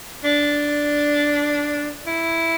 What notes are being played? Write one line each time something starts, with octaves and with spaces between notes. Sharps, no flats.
D4
E4